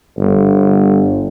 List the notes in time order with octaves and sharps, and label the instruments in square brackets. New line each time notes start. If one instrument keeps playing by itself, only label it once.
[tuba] G1